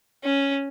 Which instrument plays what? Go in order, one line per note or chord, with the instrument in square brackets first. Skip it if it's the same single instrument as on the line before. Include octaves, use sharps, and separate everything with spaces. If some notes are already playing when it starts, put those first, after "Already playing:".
[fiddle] C#4